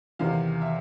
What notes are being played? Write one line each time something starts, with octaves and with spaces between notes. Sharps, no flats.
E2 C3 D#3 F5
E5